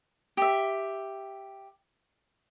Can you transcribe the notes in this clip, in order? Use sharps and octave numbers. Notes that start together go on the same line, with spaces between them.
G4 E5